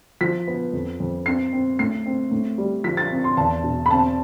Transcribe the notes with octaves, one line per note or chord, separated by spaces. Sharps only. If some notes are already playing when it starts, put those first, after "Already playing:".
F3 B6
B3
F2
F2
C4 C7
C4
A2 C7
C4
A2
G3
F3 B6
A6
C4
C6
E2 A5
B2
B5
C4 A5